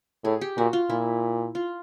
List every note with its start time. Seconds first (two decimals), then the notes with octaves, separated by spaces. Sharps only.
0.25 A2 G#4
0.41 G4
0.57 A#2 F#4
0.73 F4
0.90 A#2 E4
1.55 F4